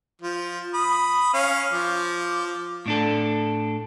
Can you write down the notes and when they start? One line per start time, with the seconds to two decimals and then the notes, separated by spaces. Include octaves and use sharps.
0.22 F3
0.74 B5 D#6
1.34 C#4 F5
1.73 F3 D6
2.86 A2 D4 A4